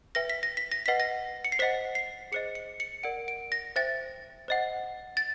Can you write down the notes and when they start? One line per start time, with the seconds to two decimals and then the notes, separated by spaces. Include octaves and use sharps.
0.15 B4 E5 G5 A#6
0.30 B6
0.43 A#6
0.57 B6
0.72 A#6
0.86 B4 D#5 F#5 B6
1.00 A#6
1.45 C#7
1.52 C7
1.59 C5 D#5 F#5 B6
1.95 C7
2.32 G#4 C5 D#5 C#7
2.55 C#7
2.80 C#7
3.03 A#4 D5 F#5 D7
3.28 D7
3.52 A#6
3.76 C5 E5 G5 A6
4.48 C5 D#5 F#5
5.17 A6